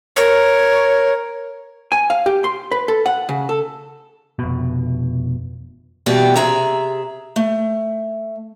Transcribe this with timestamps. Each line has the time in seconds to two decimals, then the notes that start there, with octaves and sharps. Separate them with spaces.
0.16 A#4 C#5
1.92 G#5
2.10 F5
2.26 G4
2.44 C6
2.71 B4
2.88 A4
3.06 F#5
3.29 C#3
3.49 A4
4.39 F1 B2
6.06 B2 E3 G3 B3 G4
6.36 C3 G#4 E5 A#5
7.36 A3